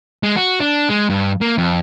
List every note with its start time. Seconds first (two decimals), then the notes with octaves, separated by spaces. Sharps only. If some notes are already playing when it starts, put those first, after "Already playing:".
0.23 G#3
0.37 F#4
0.60 D4
0.90 G#3
1.10 G2
1.41 A#3
1.58 F2